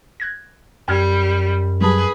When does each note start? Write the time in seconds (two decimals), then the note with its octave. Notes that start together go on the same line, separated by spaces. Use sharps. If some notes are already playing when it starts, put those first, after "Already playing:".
0.20 F#6 G#6 A#6
0.88 F#2 G3 G5 F6 G#6
1.81 F#3 G3 G#4 B4 A5